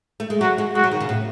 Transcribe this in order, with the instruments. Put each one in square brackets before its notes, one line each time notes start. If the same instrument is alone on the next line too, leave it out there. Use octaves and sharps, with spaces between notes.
[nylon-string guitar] A3
G#3
[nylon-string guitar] F#3 [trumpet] F#4
[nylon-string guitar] G#3
[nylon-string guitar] G#3 [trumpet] F#4
[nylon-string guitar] F#3
D#3
C#3
A2